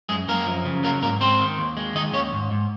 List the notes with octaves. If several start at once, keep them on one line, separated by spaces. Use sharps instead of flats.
F#2 G#3 G#4
F#2 A#3 A#4
F3
C#3
F#3 A#3 A#4
G#2 A#3 A#4
G#2 C4 C5
D#3
D#2
G#3
D#3 D#4 D#5
D#2 C#4 C#5
G#2
G#2